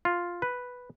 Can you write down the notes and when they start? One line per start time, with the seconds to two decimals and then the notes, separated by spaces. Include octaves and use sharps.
0.05 F4
0.42 B4